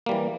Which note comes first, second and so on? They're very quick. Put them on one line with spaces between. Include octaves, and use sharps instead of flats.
A#3 G3 E3